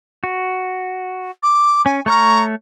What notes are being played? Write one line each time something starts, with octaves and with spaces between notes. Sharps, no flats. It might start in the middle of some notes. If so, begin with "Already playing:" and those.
F#4
D6
C#4 G#5
A3 C#5 A#5 C#6 F6